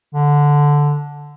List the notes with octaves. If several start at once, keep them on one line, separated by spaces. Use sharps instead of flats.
D3